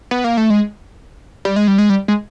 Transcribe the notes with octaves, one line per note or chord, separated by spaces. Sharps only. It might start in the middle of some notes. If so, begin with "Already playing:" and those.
B3
A#3
A3
G#3
G3
G#3
G3
G#3
G3
G#3